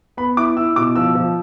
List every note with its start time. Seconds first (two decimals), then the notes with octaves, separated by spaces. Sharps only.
0.17 B3 B5
0.37 E4 D6
0.57 E4 E6
0.76 B2 D6
0.95 F3 E6
1.15 F3